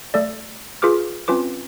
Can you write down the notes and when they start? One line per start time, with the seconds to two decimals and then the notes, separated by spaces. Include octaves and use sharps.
0.14 A3 A4 D5
0.82 F4 G#4 B4 D6 F6
1.28 C4 C#4 F4 B4 D6